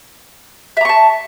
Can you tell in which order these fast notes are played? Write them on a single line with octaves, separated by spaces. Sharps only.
E5 A#5 C#6 A5